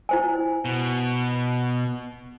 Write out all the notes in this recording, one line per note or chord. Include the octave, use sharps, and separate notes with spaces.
E4 C5 G#5
B2